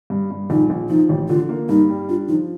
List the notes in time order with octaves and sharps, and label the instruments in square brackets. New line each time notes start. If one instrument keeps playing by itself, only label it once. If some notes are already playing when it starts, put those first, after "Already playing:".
[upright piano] G2
G2
[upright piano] A#1 [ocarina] D#4
[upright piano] A#1
[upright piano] F3 [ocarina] D#4
[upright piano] A1
[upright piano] D3 [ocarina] F4
[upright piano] A#3
[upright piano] G2 [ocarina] D#4
[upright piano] G3
[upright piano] D4 [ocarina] F4
[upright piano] F3 [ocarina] D#4